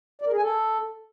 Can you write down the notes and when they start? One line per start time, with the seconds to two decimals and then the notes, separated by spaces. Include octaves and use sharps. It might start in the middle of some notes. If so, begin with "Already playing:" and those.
0.21 D5
0.27 A#4
0.32 G#4
0.37 G#5
0.42 A4